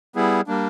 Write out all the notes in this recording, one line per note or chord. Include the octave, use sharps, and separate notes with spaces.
G3 B3 E4 G#4
G3 A#3 D4